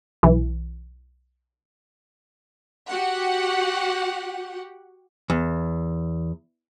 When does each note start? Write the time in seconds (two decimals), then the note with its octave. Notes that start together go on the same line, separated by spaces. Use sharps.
0.23 B1 E3
2.89 F#4 G4 F#5
5.30 E2